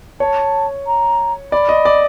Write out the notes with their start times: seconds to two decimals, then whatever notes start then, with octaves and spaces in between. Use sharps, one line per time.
0.20 C#5 A5
0.86 A#5
1.52 D5 B5
1.69 D#5
1.85 D5